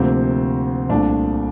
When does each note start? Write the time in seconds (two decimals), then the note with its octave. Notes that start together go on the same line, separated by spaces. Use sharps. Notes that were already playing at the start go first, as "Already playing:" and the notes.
Already playing: D2 C3 F3 A#3 C4
0.89 C2 A#2 A3 C4 D4